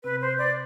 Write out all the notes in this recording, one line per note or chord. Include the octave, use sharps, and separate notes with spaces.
C3 C4 B4
C5
D5